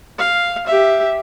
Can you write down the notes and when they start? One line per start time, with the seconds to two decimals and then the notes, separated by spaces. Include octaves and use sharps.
0.19 F5
0.66 G4 E5